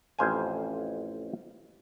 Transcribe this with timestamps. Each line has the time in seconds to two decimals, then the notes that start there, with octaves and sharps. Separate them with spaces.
0.19 A1 F2 C5 F5 G#5